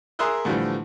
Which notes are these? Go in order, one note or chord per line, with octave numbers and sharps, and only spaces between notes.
G#4 A#4 E5 C6 D#6 F#6
A2 D3 E3 F3 G3 A3